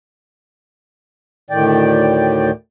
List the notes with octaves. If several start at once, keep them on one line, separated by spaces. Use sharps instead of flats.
D2 A2 D#3 D5 G5